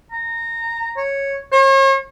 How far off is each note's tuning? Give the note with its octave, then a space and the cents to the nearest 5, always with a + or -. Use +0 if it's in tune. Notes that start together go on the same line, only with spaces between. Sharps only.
A#5 -15
C#5 -5
C#5 -40